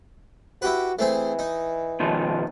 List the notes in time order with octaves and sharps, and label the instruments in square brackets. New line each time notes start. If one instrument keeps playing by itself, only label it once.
[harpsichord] E4 G4 B4 [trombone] F#4
[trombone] E3 [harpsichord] A3 C4 G#4
[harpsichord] D#4
[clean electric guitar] B2 D#3 F3